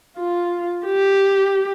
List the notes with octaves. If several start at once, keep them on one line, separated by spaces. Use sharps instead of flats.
F4
G4